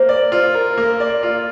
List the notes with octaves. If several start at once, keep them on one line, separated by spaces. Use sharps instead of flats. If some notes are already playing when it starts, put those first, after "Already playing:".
Already playing: A#3 C5
D5
F4
A#4
A#3
D5
F4